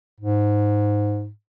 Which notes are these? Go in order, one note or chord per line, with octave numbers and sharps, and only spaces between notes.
G#2